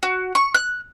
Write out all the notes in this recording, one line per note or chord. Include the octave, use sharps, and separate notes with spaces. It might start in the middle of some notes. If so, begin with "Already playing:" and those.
F#4
C#6
F#6